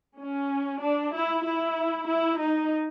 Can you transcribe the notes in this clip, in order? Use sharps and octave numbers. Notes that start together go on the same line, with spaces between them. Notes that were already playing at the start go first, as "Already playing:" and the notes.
C#4
D4
E4
E4
E4
D#4